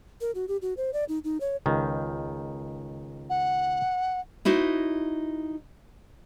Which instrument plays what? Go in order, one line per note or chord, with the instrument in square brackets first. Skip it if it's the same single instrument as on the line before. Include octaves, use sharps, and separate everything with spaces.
[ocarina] A#4
F#4
G4
F#4
C5
D5
D#4
D#4
C#5
[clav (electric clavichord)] C#2 D#3
[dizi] F#5
[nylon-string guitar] D#4 E4 F#4 C5